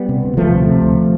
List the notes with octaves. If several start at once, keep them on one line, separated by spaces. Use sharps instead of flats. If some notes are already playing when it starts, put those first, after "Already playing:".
Already playing: G3 B3
C3
D2
D2 F3 A3
C3
C3
D2